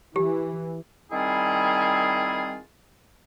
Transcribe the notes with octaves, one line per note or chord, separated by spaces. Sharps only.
E3 G4
D#3 G3 C4 E4 F4 G#4